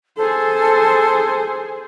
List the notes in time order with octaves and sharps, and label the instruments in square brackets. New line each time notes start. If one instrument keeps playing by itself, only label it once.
[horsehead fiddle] G#4 C5 [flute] A4